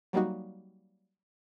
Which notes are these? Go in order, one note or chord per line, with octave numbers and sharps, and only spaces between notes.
F#3 G3 A#3 D#4 F#4